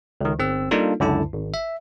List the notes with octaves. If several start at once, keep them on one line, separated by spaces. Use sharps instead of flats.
C#2 D#3
G1 C4 E6
G3 A#3 D4 D#4 F4 A4
C#2 F#2 D3 E4 A5
G#1
E5